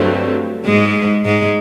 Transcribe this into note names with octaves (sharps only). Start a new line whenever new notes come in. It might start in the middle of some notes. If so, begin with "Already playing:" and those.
Already playing: G2 D3 F#3 G3 A3 C4
G#2 G#3
G#2 G#3